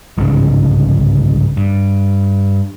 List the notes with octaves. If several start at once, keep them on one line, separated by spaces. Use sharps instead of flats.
G1 C2 G#2 C#3
G2